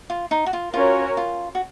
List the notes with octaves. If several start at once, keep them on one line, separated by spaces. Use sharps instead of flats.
F4
D#4
F#4
F4
C#4 F4 F#4 A#4 C#5
F4
F#4